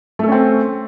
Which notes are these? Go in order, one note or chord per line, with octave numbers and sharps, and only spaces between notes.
A3 C4 C#4 A4